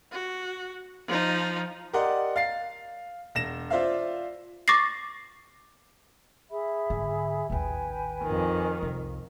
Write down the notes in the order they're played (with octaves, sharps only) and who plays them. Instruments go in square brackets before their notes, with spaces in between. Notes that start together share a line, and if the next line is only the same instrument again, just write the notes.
[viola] F#4
F3 D#4
[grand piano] G4 A#4 D5 D#5 F#5 C6
F5 A6 C7
E1 A#6 E7
F4 C5 D5 E5 F5
[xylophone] C#6 D6 A6 A#6 C7
[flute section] G#4 E5 B5
[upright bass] G#2 D3
[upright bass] A1 D#2 [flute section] B4 G5 G#5
[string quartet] F2 D#3
[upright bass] C2